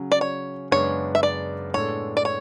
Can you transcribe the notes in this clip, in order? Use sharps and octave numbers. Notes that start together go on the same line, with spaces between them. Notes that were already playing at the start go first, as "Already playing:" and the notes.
Already playing: C#3 F#3 C#4
D5
C#5
F#2 C#3 G#3 B3 D4 C#5
E5
D5
A2 G#3 B3 D4 A4 C#5
D5
C#5